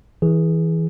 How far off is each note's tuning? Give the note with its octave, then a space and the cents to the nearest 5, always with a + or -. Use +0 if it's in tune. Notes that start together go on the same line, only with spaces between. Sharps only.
E3 -20 G#4 +0